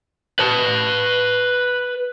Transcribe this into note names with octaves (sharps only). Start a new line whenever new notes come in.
B4 A5